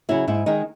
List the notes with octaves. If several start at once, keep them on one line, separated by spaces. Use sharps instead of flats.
C#3 F#3 E4
G#2 E4
D#3 G#3 D#4